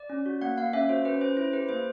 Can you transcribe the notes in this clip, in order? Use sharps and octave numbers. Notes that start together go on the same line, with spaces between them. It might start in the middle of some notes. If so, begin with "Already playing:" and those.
Already playing: D5
C#4
F#4
A#3 F#5
A#3 F5
C#4 E5
F#4 C5
C#4 B4
C#4 C5
E4 C5
G4 B4
A#3 C5